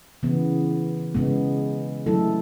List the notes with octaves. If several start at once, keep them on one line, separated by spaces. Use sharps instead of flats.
C#3 E3 B3
C#3 G#3 B3
D3 F#3 A3 E4 A4